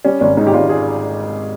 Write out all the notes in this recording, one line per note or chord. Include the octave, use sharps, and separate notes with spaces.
G3 C#4
G#1 C#4
G#2 D#4
G4
G#1 F4
G#4